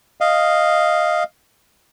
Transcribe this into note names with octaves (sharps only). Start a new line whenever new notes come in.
D#5 F5